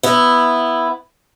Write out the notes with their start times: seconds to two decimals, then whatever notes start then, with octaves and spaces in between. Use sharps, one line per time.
0.03 B3 E4